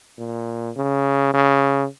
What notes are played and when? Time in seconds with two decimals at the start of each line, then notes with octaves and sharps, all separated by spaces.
0.18 A#2
0.76 C#3
1.34 C#3